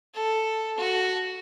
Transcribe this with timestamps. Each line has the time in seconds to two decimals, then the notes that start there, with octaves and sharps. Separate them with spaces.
0.14 A4
0.77 F#4